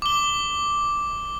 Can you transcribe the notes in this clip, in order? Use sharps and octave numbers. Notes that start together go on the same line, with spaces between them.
D6 G7